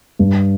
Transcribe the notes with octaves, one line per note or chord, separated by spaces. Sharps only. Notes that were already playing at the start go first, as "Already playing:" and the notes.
G2